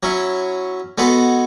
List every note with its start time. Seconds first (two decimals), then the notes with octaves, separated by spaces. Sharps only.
0.03 F#3 C#4 E4
0.98 G#3 B3 F#4 A4